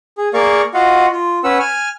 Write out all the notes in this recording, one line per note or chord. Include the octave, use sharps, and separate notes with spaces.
G#4
A#3 G#4 A#4 D5 F5 C#6
F4 F#4 D#5 F5 F#5
F4
C#4 B4 F#5 E6
G#5 F6